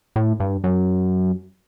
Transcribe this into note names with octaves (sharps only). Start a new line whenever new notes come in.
A2
G2
F#2